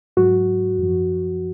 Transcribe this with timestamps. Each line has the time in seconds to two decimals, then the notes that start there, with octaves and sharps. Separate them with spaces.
0.17 G#2 F#3 F#4
0.79 F#2 F3